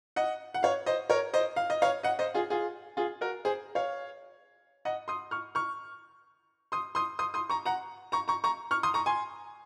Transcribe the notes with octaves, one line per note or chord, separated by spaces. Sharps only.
D#5 F#5
F#5
C#5 F5
C5 D#5
A#4 C#5
C5 D#5
F5
D#5
C#5 F5
D#5 F#5
C5 D#5
F4 G#4
F4 G#4
F4 G#4
F#4 A#4
G#4 C5
C#5 F5
D#5 F#5
C6 D#6
C#6 F6
C#6 F6
C6 D#6
C6 D#6
C6 D#6
C6 D#6
A#5 C#6
F#5 A#5
A#5 C#6
A#5 C#6
A#5 C#6
C#6 F6
C6 D#6
A#5 C#6
G#5 C6